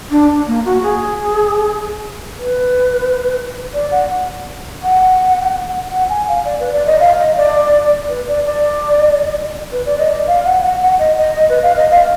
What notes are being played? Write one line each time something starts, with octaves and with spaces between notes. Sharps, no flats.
D4
A#3
F#4
G#4
B4
D5
F#5
F#5
F#5
G#5
F5
D5
B4
D5
D#5
F5
D#5
D5
B4
D5
D5
B4
D5
D#5
D5
F5
F#5
F#5
F#5
D#5
D#5
D#5
B4
F5
D#5
F5